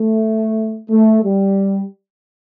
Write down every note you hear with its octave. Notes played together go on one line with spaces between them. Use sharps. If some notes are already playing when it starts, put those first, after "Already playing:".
Already playing: A3
A3
G3